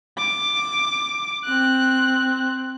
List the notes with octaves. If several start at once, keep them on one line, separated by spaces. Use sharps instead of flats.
D6
C4 F#6